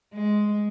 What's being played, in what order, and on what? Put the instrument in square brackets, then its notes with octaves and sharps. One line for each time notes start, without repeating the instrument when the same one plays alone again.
[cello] G#3